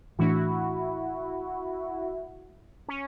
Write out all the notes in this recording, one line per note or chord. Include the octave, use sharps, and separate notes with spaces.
A2 E3 A3 D4 E4 F#4
C#4